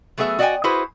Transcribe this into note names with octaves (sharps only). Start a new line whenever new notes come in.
F#3 A3 B3 G#4 E5
F#4 D5 D#5 F5 G5 G#5
E4 F#4 G#4 B4 C5